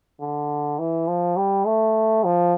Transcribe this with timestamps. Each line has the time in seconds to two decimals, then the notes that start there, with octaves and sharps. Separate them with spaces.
0.21 D3
0.79 E3
1.08 F3
1.37 G3
1.66 A3
2.24 F3